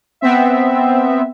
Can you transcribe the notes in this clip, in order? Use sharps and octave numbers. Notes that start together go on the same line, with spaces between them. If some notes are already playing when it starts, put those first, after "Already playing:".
B3 C4 E5